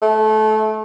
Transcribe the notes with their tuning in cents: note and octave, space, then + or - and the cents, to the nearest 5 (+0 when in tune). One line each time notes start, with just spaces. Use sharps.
A3 -25